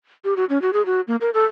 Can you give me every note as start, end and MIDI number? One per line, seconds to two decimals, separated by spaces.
0.24 0.34 67
0.37 0.45 66
0.49 0.61 61
0.62 0.71 66
0.73 0.85 68
0.86 1.01 66
1.08 1.16 58
1.21 1.30 70
1.34 1.44 69